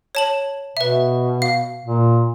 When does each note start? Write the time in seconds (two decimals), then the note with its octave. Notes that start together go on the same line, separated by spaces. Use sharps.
0.15 C#5 A5 F#7
0.77 B2 B4 E5
1.42 F5
1.86 A#2